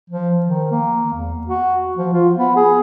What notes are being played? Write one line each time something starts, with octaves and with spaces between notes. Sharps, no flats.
F3
D#3
A#3
E2
F#4
F3
F4
B3
G#4